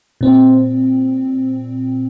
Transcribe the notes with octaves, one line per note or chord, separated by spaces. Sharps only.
A#2 C4